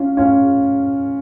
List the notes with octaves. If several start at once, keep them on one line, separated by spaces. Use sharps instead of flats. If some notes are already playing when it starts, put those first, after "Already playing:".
Already playing: C#4 F4
C#4 F4